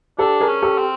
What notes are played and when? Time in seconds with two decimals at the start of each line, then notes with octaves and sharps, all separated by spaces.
0.18 D4 G4 A4
0.40 G#4 A#4
0.48 C#4
0.62 G4 A4
0.78 C4